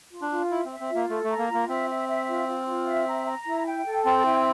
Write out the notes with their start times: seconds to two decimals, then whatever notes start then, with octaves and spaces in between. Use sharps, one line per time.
0.11 F4
0.22 D4
0.31 F4
0.51 E4 E5
0.66 C4 E5
0.80 C4
0.90 A#3 F4
1.09 A3 A4
1.24 A3
1.29 A#5
1.39 A#3
1.49 F4
1.54 A#3
1.69 C4 E5
1.89 E5
2.08 E5
2.28 F4
2.48 F4
2.67 F4
2.87 E5
3.07 A#5
3.26 A#5
3.47 E4
3.66 G5
3.86 A4
4.05 C4 G5
4.25 E4